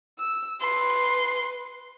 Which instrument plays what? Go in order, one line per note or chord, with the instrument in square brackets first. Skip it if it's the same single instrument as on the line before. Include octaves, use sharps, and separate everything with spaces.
[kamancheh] E6
[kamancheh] B4 [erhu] C6